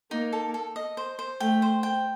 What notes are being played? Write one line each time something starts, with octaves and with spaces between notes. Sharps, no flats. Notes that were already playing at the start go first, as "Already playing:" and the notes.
A#3 D#4
A4
A4
D#5
C5
C5
A3 G5
C5
G5